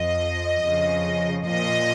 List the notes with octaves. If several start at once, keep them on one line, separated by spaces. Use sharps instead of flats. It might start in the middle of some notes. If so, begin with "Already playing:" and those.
Already playing: F2 F3 D#5
F2 C#3 F3
A#2 F3 D#5